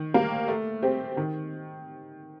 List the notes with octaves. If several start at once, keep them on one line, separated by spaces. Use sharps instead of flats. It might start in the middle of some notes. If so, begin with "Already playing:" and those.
Already playing: D#3
G3 A#3
A3
C4 G4 C5
D#3